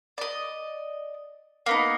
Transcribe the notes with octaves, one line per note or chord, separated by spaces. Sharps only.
D5 D#5
A#3 B3 D#4